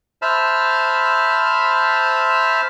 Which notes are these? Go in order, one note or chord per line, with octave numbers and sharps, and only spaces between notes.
C5 E5 A5 B5 F6